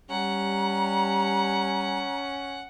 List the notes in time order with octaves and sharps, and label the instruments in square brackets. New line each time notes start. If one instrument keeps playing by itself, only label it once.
[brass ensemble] G3 [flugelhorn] C#4 [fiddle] F#5 [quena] A#5